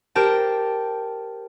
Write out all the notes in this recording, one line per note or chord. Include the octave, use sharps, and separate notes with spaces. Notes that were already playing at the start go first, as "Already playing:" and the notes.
G4 A#4 C5 G5 A5